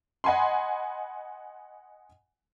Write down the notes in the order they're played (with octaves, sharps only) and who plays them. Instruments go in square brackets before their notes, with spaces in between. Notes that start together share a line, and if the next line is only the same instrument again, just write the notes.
[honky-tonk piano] D#5 F#5 G#5 B5 C6